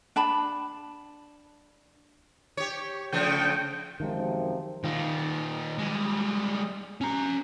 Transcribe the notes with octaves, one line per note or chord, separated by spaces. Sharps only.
D4 A5 B5
G4 C#5
C#3 F3 A3 G5
F#2 C3 D#3 F3 G#3
D#3 F4
G3 G#3
C#4 A#5